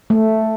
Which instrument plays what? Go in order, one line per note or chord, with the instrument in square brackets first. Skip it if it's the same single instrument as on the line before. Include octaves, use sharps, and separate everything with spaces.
[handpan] A3